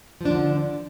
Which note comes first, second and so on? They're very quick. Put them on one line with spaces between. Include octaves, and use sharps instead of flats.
F3 D4 D3